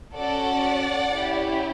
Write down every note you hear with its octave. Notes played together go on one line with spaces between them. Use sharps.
C#4 F#4 A4 D5 F#5
C#4 E4 G4